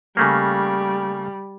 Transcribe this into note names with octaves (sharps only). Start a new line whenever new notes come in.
C#3 G3 A3 A#3